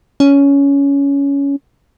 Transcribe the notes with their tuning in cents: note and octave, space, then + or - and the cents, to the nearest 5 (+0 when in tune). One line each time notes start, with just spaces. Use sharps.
C#4 +15